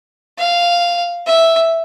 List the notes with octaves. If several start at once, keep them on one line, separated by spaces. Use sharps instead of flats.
F5
E5